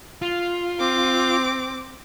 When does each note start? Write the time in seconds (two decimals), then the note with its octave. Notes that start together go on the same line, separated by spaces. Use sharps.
0.22 F4
0.79 C4 D6